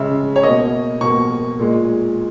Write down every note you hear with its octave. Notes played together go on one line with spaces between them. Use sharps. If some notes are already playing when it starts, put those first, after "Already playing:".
Already playing: C#3 G#3 E5
C#5
B2 A#3 D#5
B2 A#3 C#6
A#2 G#3